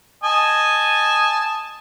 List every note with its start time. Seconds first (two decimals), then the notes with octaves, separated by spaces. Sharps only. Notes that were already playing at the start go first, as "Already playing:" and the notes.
0.24 D#5 G#5 A5